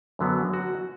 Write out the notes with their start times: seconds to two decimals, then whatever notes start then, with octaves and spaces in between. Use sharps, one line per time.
0.19 F#2 D3 F#3 B3
0.54 F#4